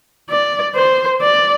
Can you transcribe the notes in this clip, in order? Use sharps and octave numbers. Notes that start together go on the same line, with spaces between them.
D5
C5
D5